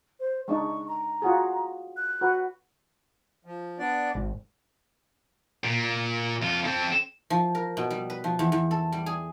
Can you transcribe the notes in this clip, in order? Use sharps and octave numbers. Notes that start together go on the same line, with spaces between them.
C5
G#3 D4 D#4 C#6
A#5
F4 F#4 G#4
F#6
F#4 B4
F3
B3 D4 D5
G#1
A#2
F2 F4
C4 A4
F3
A#4
B2
G3
B4
F3
E2
E2
A4
G3
G#4